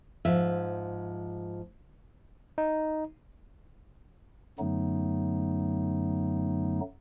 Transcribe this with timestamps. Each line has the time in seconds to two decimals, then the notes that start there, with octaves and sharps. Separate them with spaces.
0.25 G#2 F3 E5
2.58 D#4
4.59 F#2 D3 F#3 A3 B3 D#4